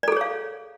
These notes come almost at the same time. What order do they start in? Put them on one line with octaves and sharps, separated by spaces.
D5 A4 G#4 C#5 F5